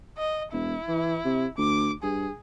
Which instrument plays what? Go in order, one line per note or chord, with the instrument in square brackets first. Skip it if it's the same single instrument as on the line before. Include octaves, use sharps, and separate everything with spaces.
[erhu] D#5
[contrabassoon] E1 [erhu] E4
[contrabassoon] E3
C3
[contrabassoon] D2 [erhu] D6
[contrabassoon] G2 [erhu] G#4